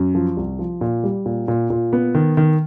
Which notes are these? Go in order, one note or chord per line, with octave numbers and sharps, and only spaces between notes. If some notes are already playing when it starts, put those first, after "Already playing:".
Already playing: F#2
F3
C2
F3
A#2
G3
A#2
A#2
A#2
B3
D#3
D#3